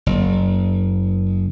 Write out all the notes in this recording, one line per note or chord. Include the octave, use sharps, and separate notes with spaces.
F#1